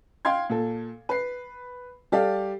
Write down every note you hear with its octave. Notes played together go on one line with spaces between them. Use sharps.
F5 G5 C6 G#6
A#2 A4
B4 C7
G3 G4 A4 D5 F5